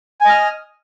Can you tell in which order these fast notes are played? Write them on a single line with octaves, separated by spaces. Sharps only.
G#5 D#5 F6 D#6